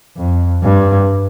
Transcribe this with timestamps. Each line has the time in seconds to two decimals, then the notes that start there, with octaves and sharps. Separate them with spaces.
0.17 F2
0.63 G2